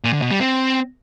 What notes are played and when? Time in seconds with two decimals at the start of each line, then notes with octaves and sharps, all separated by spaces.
0.04 A#2
0.13 D3
0.22 B2
0.31 G3
0.40 C4